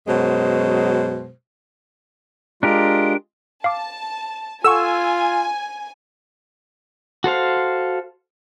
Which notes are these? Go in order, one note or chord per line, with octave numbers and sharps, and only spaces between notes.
F#2 B2 F#3 G#3 C5
G#3 D4 F4 G4 A#4
F5 A5 D6
F4 A4 F#5 G#5 C#6 E6
F#4 A4 C5 F5